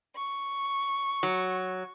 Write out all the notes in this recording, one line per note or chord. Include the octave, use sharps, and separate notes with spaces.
C#6
F#3